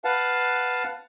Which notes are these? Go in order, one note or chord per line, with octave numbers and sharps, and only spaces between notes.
B4 F5 F#5 A5